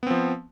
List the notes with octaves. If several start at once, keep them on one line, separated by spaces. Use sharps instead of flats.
F3 B3 C4